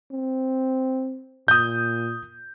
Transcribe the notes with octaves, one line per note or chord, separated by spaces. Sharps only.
C4
A#2 D#6 G6